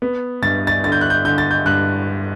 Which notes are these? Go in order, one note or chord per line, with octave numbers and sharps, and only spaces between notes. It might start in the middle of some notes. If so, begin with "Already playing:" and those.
B3
G2 A6
A6
D3 A6
G6
F#6
G6
D3 G6
A6
G6
G2 F#6